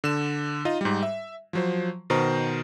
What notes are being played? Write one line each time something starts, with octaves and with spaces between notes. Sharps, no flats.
D3 E7
D#4 F4 D#5
G#2 G3
E5
F3 F#3 C5
B2 D#3 C5 A#5